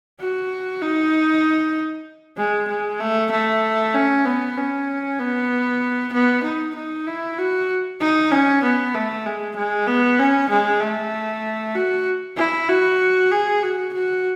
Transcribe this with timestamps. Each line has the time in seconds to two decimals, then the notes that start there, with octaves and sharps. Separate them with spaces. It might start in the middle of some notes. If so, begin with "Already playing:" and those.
0.20 F#4
0.82 D#4
2.38 G#3
2.68 G#3
3.00 A3
3.31 A3
3.95 C#4
4.25 B3
4.57 C#4
5.20 B3
6.13 B3
6.44 D#4
6.75 D#4
7.07 E4
7.38 F#4
8.01 D#4
8.31 C#4
8.63 B3
8.95 A3
9.26 G#3
9.56 G#3
9.87 B3
10.19 C#4
10.50 G#3
10.81 A3
11.75 F#4
12.37 E4
12.68 F#4
13.32 G#4
13.63 F#4
13.94 F#4